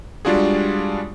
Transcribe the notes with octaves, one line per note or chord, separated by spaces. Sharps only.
G3 G#3 D4 F4 F#4 G#4